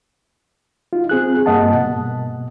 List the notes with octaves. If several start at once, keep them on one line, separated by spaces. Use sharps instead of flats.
D#4 F4
C4 G#4 F#6
G2 A#3 D#5 F#5 A5
B2